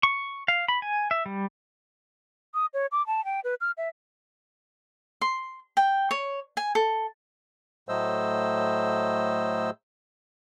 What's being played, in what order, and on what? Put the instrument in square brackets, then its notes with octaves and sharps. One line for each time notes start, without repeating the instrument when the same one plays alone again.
[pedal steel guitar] C#6
F5
B5
G#5
E5
G3
[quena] D#6
C#5
D6
A5
G5
B4
F6
E5
[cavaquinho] C6
G5
C#5
G#5
A4
[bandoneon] A2 F#3 A3 C5 D#5 E6